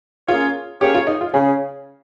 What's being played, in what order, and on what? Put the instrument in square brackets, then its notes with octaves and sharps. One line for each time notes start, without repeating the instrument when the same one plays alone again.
[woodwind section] A#3 C#4 G#4 C#5 [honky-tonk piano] F4
[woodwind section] A#3 C#4 G#4 C#5 [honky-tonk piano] G4
[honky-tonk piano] F4
D#4
F4
[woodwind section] C#3 [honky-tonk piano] G#4